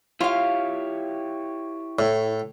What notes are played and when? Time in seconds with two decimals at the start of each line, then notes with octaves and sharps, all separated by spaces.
0.20 E4 F4 G4 C#5 F5
1.99 A2